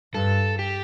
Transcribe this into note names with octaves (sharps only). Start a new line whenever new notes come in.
G2 A4
G4